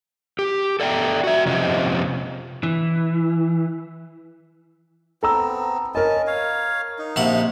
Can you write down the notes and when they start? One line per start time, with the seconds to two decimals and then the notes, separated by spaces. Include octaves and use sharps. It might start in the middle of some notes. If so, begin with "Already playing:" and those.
0.39 G4
0.80 A4 D5 E5 G5
1.24 F#4 E5
1.46 F2 C3 C#4 F4 G4 D#5
2.63 E3
5.23 B3 C4 A4 A#5 E6
5.95 C#4 A#4 D#5 A5
6.27 C#5 F5
6.99 D#4
7.16 A#1 C3 F#5